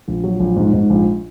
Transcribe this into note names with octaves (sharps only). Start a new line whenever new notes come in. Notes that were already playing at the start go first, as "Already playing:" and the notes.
A#1
F#3
A#1
G#2
G#2
A#1